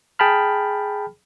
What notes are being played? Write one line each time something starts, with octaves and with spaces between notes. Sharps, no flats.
G#4 G5 A5 B5 F6